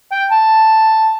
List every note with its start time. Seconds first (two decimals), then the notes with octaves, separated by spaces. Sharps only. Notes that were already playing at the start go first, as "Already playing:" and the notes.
0.12 G5
0.32 A5